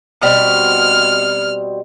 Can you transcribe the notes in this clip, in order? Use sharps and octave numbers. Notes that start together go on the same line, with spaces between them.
B2 G3 C4 F6